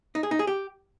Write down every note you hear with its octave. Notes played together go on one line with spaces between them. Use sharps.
D#4
G#4
D#4
G#4
G4